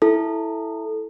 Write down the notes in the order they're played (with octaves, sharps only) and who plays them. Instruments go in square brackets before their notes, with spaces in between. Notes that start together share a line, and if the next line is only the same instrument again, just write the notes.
[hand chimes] E4 A4